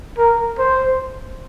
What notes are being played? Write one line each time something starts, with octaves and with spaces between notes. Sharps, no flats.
A#4
C5